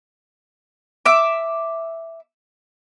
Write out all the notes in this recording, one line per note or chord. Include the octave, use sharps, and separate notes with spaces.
E5 D6